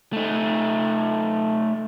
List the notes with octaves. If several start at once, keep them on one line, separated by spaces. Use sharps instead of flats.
A3 D#4